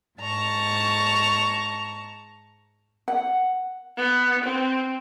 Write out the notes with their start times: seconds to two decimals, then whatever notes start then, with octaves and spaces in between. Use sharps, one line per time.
0.19 G#2 A5 A#5 C#6
3.08 F#5
3.97 B3
4.44 C4